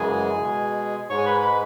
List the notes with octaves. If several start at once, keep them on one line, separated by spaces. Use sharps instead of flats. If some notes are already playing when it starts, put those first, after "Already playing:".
Already playing: F#2 C#3 E3 G#3 G#4 G#5
B2 G#3
G#2 G#3 C#5 C#6
G#5
B4 B5
B4 B5